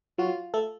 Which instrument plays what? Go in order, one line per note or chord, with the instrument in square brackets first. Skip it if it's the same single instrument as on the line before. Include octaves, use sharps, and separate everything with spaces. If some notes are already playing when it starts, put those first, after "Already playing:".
[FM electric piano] F#3 F#4 [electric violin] F4
[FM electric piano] A3 A4